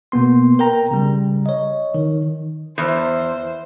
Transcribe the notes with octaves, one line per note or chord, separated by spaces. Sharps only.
B2 A#3 B3 C6
A#4 G5 A#5
C#3 G3
C#5 D#5
D#3
E2 C5